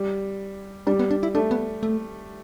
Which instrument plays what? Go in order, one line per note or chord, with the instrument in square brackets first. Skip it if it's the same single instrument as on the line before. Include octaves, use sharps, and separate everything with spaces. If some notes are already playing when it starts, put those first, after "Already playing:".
Already playing: [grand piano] G3
[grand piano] G3 [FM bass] D4
[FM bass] B3
D4
E4
[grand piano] A3 [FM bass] D4
[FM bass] B3
A3